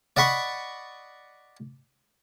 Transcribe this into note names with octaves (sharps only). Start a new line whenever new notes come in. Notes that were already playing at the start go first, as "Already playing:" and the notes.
D5 D#5 F#5 B5 C#6